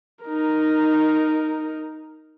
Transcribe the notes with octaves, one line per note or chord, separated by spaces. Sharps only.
D#4 A#4